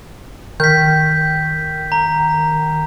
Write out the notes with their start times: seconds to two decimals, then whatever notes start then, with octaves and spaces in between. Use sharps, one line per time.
0.60 D#3 G6 B6
1.92 A#5